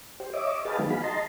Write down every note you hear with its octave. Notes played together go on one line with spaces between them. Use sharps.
G4 C5
C#5 D#5 E5 D6
G4 G#4 B4 D#5 F5 A5
D#3 F#3 G#3 B3 D#4
F#4 G#4 F5 B5
D#5 A5 A#5 C6